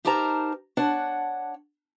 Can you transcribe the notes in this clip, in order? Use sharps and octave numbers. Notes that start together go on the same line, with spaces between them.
D#4 G4 A#4 C5 A5 A#5
D4 C#5 F#5 A5